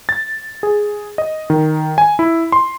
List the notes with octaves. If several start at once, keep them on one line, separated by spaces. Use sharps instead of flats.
A6
G#4
D#5
D#3
G#5
E4
C6